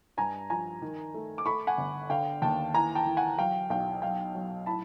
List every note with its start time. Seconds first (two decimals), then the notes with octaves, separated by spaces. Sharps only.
0.17 G2 G#5 A#5
0.50 F3 G#5 A#5
0.82 D#3
1.15 A3
1.38 D6
1.46 A3 B5 C#6
1.67 F#5 G#5
1.77 G1
2.10 D3 F5 G5
2.42 D#2 G5 A5
2.74 E3 G#5 A#5
2.95 G5 A5
3.06 E3
3.17 F#5 G#5
3.38 F#3 F5 G5
3.70 B1 F5 G5
4.02 F#3 F5 G5
4.35 F#3
4.66 A2 A5 B5